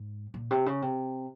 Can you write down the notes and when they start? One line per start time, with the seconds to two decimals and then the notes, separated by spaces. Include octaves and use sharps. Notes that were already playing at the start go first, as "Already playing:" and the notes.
Already playing: G#2
0.34 A#2
0.51 C3
0.66 C#3
0.82 C3